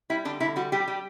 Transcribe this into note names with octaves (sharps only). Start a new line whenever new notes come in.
G3 E4
D3 D4
D3 E4
G3 F#4
G3 G4
G3